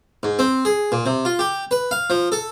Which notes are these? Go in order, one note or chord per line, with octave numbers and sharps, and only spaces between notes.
G#2
C4
G#4
A#2
C3
F4
G4
B4
F5
F3
A4